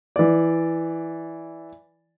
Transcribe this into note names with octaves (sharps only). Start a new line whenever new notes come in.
E3 D5